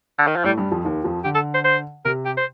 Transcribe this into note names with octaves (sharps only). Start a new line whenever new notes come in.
D3
D#3
F3
A2 G3 A3
G2 G3
F2 F3
D#2 D#3
F2 F3
D3 G4
A4
C5
C5
C3 A#4
G4
C5